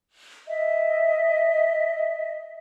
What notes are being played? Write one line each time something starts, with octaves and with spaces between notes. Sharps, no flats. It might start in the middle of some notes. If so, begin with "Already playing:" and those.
D#5 E5